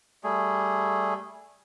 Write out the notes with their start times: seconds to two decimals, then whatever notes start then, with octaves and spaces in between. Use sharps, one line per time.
0.24 G3 A3 G#4